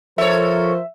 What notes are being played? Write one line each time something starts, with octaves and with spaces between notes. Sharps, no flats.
F3 A4 A#4 C5 C#5 E5